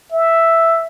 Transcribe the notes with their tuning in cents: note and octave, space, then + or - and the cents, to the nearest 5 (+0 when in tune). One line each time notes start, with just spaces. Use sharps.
E5 +0